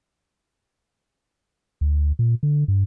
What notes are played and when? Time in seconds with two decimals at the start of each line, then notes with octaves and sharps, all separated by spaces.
1.81 D2
2.19 A#2
2.43 D3
2.68 G2